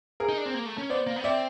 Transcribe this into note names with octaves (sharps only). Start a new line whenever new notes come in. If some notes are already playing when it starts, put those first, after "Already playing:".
G#4 A#4
D#4
D4
C4
A#3
A3
C#4
B3 C5 D5
A#3
B3
C4 D5 E5